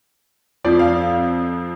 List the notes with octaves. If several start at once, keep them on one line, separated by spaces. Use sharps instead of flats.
F2 F3 D5
F5